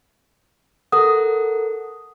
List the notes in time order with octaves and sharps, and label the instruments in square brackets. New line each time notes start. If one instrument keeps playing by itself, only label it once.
[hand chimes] A4 A#4 F#5 [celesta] D#6